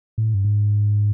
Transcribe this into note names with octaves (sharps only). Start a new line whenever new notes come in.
A2
G2
G#2